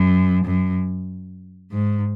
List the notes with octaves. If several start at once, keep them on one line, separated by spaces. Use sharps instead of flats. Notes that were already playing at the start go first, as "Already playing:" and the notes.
Already playing: F#2
F#2
G#2